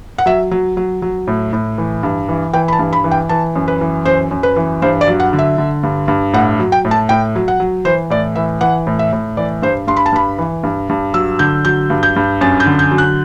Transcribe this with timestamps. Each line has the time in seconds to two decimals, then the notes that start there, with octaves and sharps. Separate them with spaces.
0.18 F#5
0.26 F#3 E5
0.51 F#3
0.77 F#3
1.02 F#3
1.27 A2
1.53 A2
1.78 E3
2.03 G2
2.29 E3
2.53 E3 G5
2.68 B5
2.73 A5
2.79 G2
2.93 B5
3.04 E3
3.11 G5
3.29 E3 A5
3.56 F#2
3.68 B4
3.81 E3
4.05 F#2 C5
4.31 F#2
4.43 B4
4.56 E3
4.82 G2 C5
5.01 D5
5.08 F#3
5.20 F#5
5.33 D3
5.39 E5
5.58 D3
5.83 G2
6.08 G2
6.33 A2 F#5
6.60 F#3
6.72 G5
6.85 A2
6.91 A5
7.09 A2 G5
7.35 F#3
7.48 F#5
7.60 F#3
7.85 E3 C5
8.10 A2 D5
8.36 E3 E5
8.61 E3 F#5
8.87 A2
8.99 E5
9.13 A2
9.37 E3 D5
9.62 G2 C5
9.87 G2 C6
9.97 B5
10.06 A5
10.13 G2 B5
10.38 E3
10.63 G2
10.89 G2
11.14 F#3 E6
11.39 D3 G6
11.65 F#3 G6
11.90 G2
12.03 G6
12.16 G2
12.41 F#2 A6
12.60 G6
12.66 D3
12.79 G6
12.91 F#3
12.98 F#6